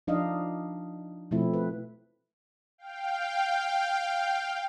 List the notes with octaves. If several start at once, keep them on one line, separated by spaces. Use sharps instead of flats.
F3 D4 D#4 D#5 F5
B2 F3 A3 C4 E4
B4
F5 G5